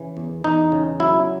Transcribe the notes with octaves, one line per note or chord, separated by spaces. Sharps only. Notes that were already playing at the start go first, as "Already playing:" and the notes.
Already playing: C#3 E3
E2
E2 D#4
C#3
F#3 E4